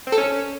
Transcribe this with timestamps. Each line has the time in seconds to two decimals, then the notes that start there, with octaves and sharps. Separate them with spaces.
0.07 C4
0.12 A4
0.18 C#4